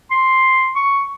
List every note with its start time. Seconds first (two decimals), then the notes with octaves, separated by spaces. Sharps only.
0.11 C6
0.76 C#6